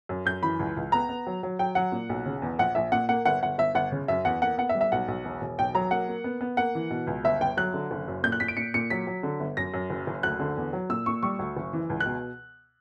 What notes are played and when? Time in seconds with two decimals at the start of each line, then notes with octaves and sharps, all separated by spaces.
0.09 F#2
0.26 F#2 G6
0.43 E3 B5
0.59 C#2
0.77 C#2
0.92 B3 A#5
1.09 B3
1.27 F#3
1.43 F#3
1.59 F#3 G5
1.75 F#3 F#5
1.92 A#2
2.09 B1
2.26 C#3
2.42 E2
2.59 A#1 F#5
2.75 A#1 E5
2.92 A#2 F#5
3.09 A#3 F#5
3.25 G1 F#5
3.43 G1 F#5
3.58 G1 E5
3.75 G1 F#5
3.92 C#3
4.08 F#2 E5
4.25 E2 F#5
4.42 A#3 F#5
4.58 B3 F#5
4.69 E5
4.75 G3
4.81 E5
4.92 B1 F#5
5.08 B1
5.24 E1
5.41 E1
5.59 B1 G5
5.75 F#3 A#5
5.91 A#3 F#5
6.09 A#3
6.24 B3
6.41 B3
6.57 A#3 F#5
6.75 E3
6.90 B2
7.07 C#2
7.24 G1 E5
7.41 G1 G5
7.57 F#3 F#6
7.74 D3
7.91 F#1
8.08 F#2
8.23 A#2 G6
8.32 F#6
8.40 A#2 B6
8.48 D7
8.57 A#2 C#7
8.74 A#2 C#7
8.90 F#3 B6
9.07 F#3
9.23 D3
9.40 G1
9.57 F#2 A#6
9.74 F#2
9.90 F#1
10.07 F#1
10.23 D2 F#6
10.39 D3
10.57 E2
10.73 F#3
10.89 A#2 E6
11.06 A#2 C#6
11.23 G3 C#6
11.39 D2
11.57 F#1
11.73 E3
11.90 C#2
12.00 F#6
12.06 B2